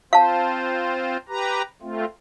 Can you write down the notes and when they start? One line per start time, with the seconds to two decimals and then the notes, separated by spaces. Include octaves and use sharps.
0.13 C4 F4 C5 F5 A5
1.29 G4 B4 A#5
1.82 A3 C4 F4